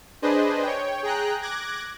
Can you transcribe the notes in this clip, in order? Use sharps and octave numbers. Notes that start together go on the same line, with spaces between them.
D4 G#4 B4 C5 D#5
C#5 G5
G#4 G5 A#5 F#6
D6 F#6 G#6 A#6